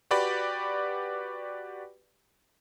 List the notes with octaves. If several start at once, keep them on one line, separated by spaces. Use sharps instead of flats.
F#4 G4 B4 D5 B5